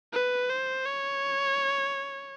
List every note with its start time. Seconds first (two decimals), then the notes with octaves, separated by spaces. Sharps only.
0.13 B4
0.50 C5
0.85 C#5